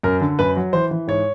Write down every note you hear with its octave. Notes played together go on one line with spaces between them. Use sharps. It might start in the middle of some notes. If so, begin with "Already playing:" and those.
F#2 A#4
D3
F#2 B4
F#3
E3 C5
E3
G#2 C#5